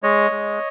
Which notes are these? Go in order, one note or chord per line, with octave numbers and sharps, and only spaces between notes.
G#3 C#5 D#5
G#3